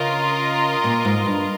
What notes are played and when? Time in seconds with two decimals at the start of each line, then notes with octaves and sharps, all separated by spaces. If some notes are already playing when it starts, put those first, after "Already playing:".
Already playing: C#3 F4 A#4 D#5
0.84 A#2
1.05 G#2
1.26 G2